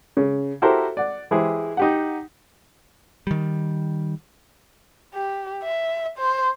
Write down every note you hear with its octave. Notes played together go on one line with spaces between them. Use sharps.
C#3
E4 F#4 G4 A4 A#4 C5
D5 F#5
E3 G#3 E4 G4 G#4 C5
D#4 G4 F#5
D#3 G3
G4
E5
C5